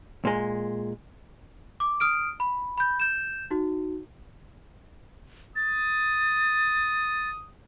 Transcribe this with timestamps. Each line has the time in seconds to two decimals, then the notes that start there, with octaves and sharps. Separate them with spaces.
0.25 A#2 G#3
1.80 D6
2.00 D#6 F6 D7
2.40 B5
2.78 B5 G6
3.00 G6 E7
3.51 D#4 F#4
5.56 D#6 A6